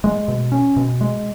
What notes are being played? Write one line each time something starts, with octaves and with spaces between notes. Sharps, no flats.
G#3
B2
C#4
B2
G#3